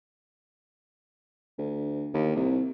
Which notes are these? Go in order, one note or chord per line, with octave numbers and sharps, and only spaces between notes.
D2
D#2
C2